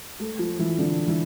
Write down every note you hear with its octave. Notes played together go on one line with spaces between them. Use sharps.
A3 A4
F3 F4
E3 E4
D3 D4
E3 E4